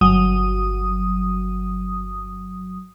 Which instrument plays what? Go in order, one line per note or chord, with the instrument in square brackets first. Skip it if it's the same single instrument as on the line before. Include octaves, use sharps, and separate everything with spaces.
[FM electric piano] G1 F#3 D#6